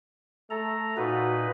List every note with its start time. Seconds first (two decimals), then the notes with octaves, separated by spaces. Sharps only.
0.50 A3 A4 A#5
0.97 A#2 D#4 F#4 B4